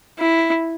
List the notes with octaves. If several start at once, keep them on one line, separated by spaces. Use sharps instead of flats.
E4